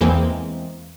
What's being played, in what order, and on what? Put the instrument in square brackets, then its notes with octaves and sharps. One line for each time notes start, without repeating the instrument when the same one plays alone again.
[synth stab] E2 E3 G#3 A#3 C4